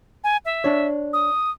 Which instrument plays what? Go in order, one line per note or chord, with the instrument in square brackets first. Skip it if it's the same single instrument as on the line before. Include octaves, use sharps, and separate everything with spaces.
[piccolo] G#5
E5
[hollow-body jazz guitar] D4 C#5
[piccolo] D#6